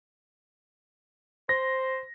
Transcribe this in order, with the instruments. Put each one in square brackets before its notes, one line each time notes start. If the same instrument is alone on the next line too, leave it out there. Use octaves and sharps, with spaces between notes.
[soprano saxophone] C5 [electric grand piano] A#6